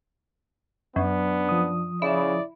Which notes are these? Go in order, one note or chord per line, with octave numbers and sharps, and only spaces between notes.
F#2 B3 D4
F3 D#6
C#3 E4 D5